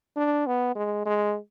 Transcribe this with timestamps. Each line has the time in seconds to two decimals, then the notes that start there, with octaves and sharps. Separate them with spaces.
0.16 D4
0.46 B3
0.75 G#3
1.06 G#3